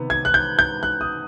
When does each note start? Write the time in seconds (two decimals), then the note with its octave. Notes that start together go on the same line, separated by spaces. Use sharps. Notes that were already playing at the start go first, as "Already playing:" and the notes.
Already playing: C3 D#3 B3
0.10 G#6
0.25 F#6
0.34 G6
0.59 G6
0.83 F#6
1.01 D#6